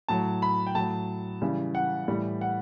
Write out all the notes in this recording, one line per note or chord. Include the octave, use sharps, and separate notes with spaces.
A2 F#3 A5
B5
G5
A2 F#3 A5
C#3 E3 G3
F#5
A2 E3 G3
F#5